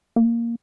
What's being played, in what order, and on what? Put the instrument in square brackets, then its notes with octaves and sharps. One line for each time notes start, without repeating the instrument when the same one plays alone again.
[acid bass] A#3